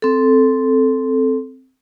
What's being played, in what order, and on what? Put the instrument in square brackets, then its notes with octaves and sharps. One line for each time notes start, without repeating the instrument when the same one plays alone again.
[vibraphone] C4 A4